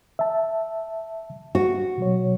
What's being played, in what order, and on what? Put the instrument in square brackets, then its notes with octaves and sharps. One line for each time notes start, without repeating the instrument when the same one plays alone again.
[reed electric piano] E5 A5
[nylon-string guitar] F#4
[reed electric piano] B2 F#3 C#5